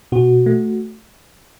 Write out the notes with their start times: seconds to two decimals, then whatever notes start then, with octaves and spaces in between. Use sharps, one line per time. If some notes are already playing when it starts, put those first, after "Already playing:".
0.12 B2 F#4
0.46 A3